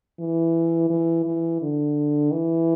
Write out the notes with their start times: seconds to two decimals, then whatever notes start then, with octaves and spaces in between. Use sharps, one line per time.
0.19 E3
0.90 E3
1.26 E3
1.62 D3
2.32 E3